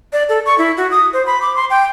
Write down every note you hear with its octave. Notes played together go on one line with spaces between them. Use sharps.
D5
A4
C#6
E4
F#4
D#6
C5
B5
D6
C6
G5